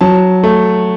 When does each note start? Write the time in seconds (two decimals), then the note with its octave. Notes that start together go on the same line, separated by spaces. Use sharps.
0.01 F#3 A5
0.44 A3